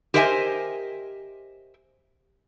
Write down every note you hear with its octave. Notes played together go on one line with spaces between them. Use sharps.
G4 A#4 C5 D#5 E5 G#5